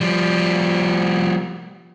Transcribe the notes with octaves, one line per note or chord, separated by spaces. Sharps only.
F3 G3